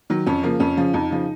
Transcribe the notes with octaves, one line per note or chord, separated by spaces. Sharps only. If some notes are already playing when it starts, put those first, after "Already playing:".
D#3 F#3
F2 C#4
C#3 F3 A#3
F2 C#4
C#3 F3
F2 D#4
C#3 F3